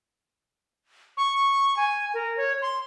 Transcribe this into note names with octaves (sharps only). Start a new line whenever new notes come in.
C#6
G#5
A#4
C#5
C6